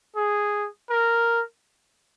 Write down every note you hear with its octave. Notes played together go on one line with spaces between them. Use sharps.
G#4
A#4